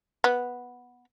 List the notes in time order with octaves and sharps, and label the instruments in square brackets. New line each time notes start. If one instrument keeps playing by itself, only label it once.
[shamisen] B3